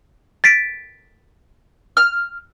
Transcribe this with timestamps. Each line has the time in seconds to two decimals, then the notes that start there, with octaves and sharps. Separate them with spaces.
0.44 A6 B6 D7
1.97 F6